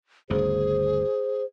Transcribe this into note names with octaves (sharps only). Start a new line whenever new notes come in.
G1 D2 C#3 G#4 C5